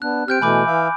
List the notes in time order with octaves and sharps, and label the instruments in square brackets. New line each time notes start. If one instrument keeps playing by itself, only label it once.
[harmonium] B3 D4 [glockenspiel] F#6
[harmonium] C4 G4 [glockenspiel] F6 G6 D7
[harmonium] B2 E3 A3 [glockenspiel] G#5 B5 D6
[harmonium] E3 E5 F5